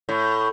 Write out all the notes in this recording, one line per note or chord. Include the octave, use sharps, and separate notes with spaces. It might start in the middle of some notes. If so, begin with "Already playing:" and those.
A2